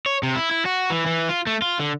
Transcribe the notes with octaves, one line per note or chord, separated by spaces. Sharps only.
C#5
C3
E4
E4
F#4
E3
E3
F4
A3
F4
D3